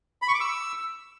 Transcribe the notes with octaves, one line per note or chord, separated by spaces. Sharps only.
B5
C#6
D6
E6